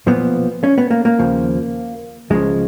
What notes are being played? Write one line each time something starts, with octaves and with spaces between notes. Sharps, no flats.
B1 A#2 F3 B3
C#4
B3
A#3
A#3
D#2 C#3 F3
C#2 C#3 F3 G#3